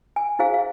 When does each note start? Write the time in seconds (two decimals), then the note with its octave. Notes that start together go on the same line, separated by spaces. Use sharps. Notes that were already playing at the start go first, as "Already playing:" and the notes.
0.16 G#5
0.39 E4 G#4 C5 F5
0.54 F5